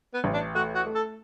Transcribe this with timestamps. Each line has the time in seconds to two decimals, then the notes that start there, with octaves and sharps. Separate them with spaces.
0.14 B3
0.24 A1
0.34 D4
0.55 A3 F#4
0.75 F#4
0.86 A3
0.95 A4